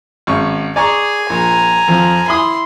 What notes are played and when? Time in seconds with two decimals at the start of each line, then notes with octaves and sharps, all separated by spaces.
0.27 G#1 C#4 C#6
0.76 G#4 D5 G#5 A#5 C#6
1.30 A#1 A#5
1.88 F2 F3
2.27 E4 B5 C6 D#6